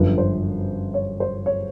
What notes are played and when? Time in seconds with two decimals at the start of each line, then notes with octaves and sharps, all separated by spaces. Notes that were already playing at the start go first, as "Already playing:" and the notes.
Already playing: G1 F#2 D3 F3 B4
0.18 C5
0.94 C#5
1.20 C5
1.46 C#5